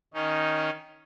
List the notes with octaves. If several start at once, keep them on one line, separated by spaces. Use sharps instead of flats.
D#3 C#4 D#4